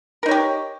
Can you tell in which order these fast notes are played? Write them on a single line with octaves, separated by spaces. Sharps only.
A#4 D#4 C#5 G4